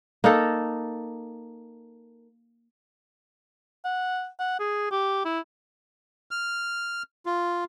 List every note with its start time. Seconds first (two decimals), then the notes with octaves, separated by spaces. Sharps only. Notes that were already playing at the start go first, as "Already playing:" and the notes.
0.24 A#3 D#4 A4
3.85 F#5
4.40 F#5
4.60 G#4
4.91 G4
5.25 E4
6.31 F6
7.26 F4